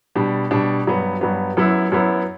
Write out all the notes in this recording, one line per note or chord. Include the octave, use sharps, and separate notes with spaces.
B2 G3 D4
B2 G3 D4
G2 F#3 B3
G2 F#3 B3
F#2 F#3 B3 E4
F#2 F#3 B3 E4